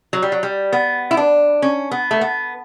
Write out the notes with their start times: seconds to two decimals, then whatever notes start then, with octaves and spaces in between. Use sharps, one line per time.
0.13 F#3
0.22 G3
0.32 F#3
0.43 G3
0.73 B3
1.11 E4
1.17 D4
1.62 C#4
1.91 B3
2.11 A3
2.21 B3